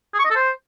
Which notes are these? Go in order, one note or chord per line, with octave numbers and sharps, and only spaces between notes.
G#4
C#6
D#5
A4
C5